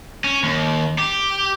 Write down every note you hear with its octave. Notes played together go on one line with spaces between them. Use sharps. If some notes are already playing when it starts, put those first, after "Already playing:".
C#4
D#2
G4